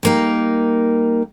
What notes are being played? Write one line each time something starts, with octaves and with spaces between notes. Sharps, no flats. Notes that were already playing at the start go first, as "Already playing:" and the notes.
G3 A#3 D#4